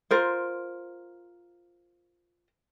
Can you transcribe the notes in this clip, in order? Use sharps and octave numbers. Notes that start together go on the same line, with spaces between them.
F4 A#4 C5